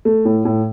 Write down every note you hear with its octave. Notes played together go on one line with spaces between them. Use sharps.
A3
A2
A2